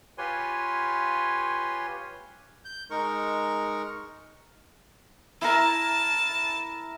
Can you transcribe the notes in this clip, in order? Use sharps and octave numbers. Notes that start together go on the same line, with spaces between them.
F4 G4 B4 C#5 G#5 C6
G6
G#3 D#4 A#4 C#6
E4 A#4 A5